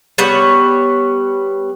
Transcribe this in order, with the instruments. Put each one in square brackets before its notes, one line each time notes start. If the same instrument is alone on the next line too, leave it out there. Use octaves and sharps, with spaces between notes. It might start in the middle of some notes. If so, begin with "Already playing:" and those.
[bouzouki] G3 B3 C#5